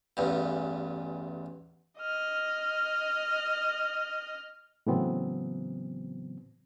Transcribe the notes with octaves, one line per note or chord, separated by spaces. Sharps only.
A1 E2 G2
D#5 F6
A2 C#3 E3 F#3 B3 C4